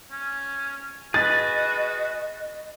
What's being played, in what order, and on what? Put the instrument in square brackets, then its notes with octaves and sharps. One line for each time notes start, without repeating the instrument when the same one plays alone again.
[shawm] C#4
[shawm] F#4 [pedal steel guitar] G#4 B4 [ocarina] D#5 [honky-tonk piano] A6